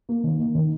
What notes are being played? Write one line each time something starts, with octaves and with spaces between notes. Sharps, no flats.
A#3
D#3
A#3
D#3